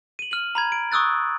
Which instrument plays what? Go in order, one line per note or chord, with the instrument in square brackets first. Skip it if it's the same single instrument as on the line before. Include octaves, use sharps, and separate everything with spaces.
[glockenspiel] D#7 F#7
F6 D#7 F#7
A#5 B5 G#6
D7
C#6 D#6 E6 F#6 A6